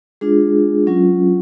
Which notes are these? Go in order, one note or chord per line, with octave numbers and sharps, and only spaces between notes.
G#3 D4 F4 G#4
F#3 C#4 F4